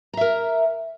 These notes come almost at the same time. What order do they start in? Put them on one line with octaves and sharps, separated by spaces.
A#5 E5 A#4